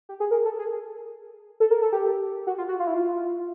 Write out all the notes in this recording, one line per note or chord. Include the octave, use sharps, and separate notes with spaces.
G4
G#4
A#4
A4
G#4
A4
A#4
A4
G4
F#4
F4
F#4
F4
E4
F4